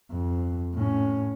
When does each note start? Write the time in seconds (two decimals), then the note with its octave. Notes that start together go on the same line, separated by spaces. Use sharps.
0.12 F2
0.74 A2 C#4